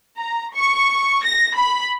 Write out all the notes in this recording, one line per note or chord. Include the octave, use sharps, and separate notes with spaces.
A#5
C#6
A#6
B5